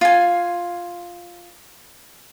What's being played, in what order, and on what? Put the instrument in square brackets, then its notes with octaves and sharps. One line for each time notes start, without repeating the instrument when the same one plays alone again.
[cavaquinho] F4 G#5